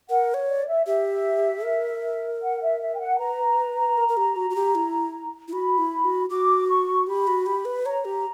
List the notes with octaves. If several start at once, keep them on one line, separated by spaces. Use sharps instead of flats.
A#4 F#5
C#5
D5
E5
G4 E5
A#4
F#5
E5
E5
G5
F#5
B4 A#5
A#4
A#4
G4
F#4
F#4
G4
E4
E4
F#4 B5
E4
F#4
F#4 D6
C#6
G4 B5
F#4
G4
B4
C#5 A#5
G4